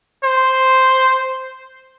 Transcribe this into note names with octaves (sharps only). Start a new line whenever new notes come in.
C5